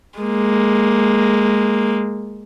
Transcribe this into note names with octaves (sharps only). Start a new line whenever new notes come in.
G#3 A#3